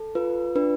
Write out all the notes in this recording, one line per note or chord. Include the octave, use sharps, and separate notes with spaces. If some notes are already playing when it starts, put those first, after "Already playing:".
Already playing: A4
F4 B4
D4 B4